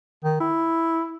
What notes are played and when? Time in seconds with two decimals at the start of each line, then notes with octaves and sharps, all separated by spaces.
0.24 D#3
0.40 E4